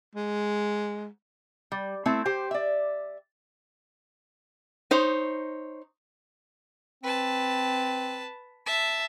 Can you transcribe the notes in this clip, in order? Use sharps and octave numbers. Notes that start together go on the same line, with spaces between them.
G#3
G3
A3 C4 E4
G4 C5
D5 E5
D#4 C5 C#5
C4 B4 A5
E5 A5